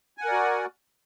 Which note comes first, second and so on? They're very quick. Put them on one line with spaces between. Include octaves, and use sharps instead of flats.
G#5 F#5 A#4 D5 F#4